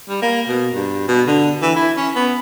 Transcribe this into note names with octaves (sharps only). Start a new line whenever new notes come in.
G3
A#3
B2
G2
B2
D3
E3
E4
C#4
B3